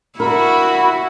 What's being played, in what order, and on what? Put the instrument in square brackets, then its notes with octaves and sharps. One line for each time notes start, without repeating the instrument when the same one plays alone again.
[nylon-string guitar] D4 A#4 [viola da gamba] E4 F#4 [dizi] B5